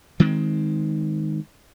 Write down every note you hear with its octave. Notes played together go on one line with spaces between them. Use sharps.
D#3 G#3 C4